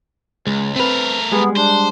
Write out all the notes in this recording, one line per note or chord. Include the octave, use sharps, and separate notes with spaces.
C#2 G#3
A3 C4 A#4 B4
G3 G#3 B3 G#4
D4 C5